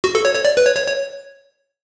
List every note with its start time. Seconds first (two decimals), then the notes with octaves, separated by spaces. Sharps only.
0.04 F#4
0.15 A4
0.25 C#5
0.35 C#5
0.45 D5
0.57 B4
0.65 C#5
0.76 C#5
0.87 C#5